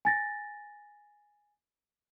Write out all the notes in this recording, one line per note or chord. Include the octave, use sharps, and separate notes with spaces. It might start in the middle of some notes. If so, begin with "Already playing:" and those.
G#5 A6 A#6